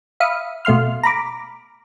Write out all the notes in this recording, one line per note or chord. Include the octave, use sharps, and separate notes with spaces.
E5 F5 B5 D#6 C#7
B2 A3 F5 C6 F6
A#5 B5 D6